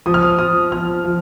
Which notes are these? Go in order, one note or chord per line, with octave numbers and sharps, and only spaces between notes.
F3 D#6
F6
D#6
F3 D#6
F3 F6
F3